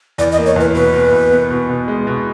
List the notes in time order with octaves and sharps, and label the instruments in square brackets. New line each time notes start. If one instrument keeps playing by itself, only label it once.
[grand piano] E2 [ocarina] D5
[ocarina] D#5
[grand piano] A#3
[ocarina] C#5
[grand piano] E2 [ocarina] B4
[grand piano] B2 [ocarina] B4
[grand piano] B2
E2
B3
B2
B2
G#3
B2